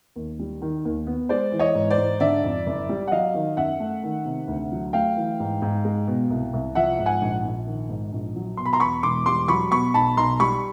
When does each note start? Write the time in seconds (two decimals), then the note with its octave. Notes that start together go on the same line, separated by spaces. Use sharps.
0.16 D#2
0.39 G3
0.62 D#3
0.85 D#2
1.07 B3
1.29 G#3 C5 D5
1.52 E3
1.59 C#5 D#5
1.75 G#2
1.90 C5 D5
1.98 G#2
2.20 D3 D5 E5
2.44 F2
2.66 F#1
2.89 G3
3.08 F#5
3.12 F#3 D#5 F5
3.34 D#3
3.57 F#2 E5 F#5
3.80 A3
4.03 D#3
4.25 C3
4.48 D2
4.72 F#3
4.93 A3 F5 G5
5.16 E3
5.40 G#2
5.62 G#2
5.85 G#3
6.07 B2
6.30 C2
6.53 C2
6.75 F3 E5 F#5
6.99 G#2
7.06 F#5 G#5
7.21 A#1
7.44 A#1
7.66 D#3
7.89 G#2
8.12 A#1
8.35 F#3
8.57 B2 C6
8.65 B5
8.73 A#5 C6
8.80 E2 B5 C#6
9.03 E1 C6 D6
9.26 G3 C6 D6
9.48 F#3 B5 C#6
9.71 B2 B5 C#6
9.94 B1 A5 B5
10.17 B1 A#5 C6
10.40 G3 B5 C#6